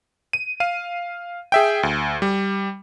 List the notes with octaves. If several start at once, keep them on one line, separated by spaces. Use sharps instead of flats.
D#7
F5 D#7
G#4 E5 G5
D2
G3